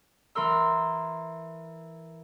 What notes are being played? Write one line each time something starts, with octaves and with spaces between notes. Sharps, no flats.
E3 A#4 C6 E6